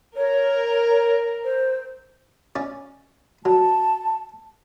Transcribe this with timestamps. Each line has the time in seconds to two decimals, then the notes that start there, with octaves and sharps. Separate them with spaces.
0.16 A#4 C#5
1.44 C5
2.56 C#4 D5
3.45 F#3 A5